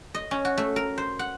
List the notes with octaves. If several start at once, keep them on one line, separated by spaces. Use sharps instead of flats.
D#5
C#4
F#4
A3
A#4
C5
F#5